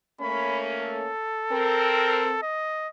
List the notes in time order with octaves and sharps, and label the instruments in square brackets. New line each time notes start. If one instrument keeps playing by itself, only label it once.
[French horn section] A3 A#3 C#4 [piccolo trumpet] B5
[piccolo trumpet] A4
[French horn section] C4 A#4
[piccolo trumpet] D#5